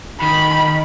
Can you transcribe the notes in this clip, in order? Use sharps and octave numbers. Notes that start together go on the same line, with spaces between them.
D#3 B5